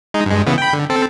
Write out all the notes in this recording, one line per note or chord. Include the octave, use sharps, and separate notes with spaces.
G#3 D#4
G2 G#3
C#3 E3 B3
G5 B5
D3
C4 A4